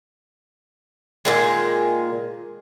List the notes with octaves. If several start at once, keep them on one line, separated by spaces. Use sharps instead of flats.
A#2 D#3 G#3